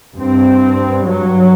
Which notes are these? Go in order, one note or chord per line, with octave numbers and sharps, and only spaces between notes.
G2 C4
F#3